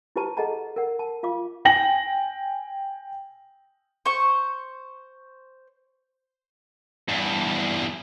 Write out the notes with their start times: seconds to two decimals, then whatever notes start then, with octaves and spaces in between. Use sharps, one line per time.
0.16 E4 G4 B4 C5 A5 A#5
0.37 G#4 A4 D#5 F#5 A5 A#5
0.76 A#4 F#5
0.99 A5
1.23 F4 F5 D6
1.65 G5 G#5 A#6 F#7
4.05 C5 C#6
7.09 E2 G2